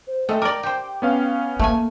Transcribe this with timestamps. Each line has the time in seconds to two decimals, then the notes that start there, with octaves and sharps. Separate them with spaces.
0.07 C5
0.29 G#3 A3 A4 E5 G5
0.42 A#4 D5 D6
0.63 G4 C5
1.02 B3 C#4 F5
1.59 A3 A#3 G#5